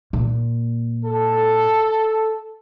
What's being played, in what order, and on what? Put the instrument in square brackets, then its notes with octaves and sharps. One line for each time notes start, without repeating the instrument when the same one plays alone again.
[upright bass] A#2
[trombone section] A4